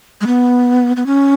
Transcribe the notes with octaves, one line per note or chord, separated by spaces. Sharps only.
G#3
B3
B3
C#4